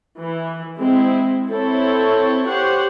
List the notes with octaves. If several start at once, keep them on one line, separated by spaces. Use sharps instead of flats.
E3
G#3 C4 E4
C4 E4 A4 C#5
G4 C5 C#5 F#5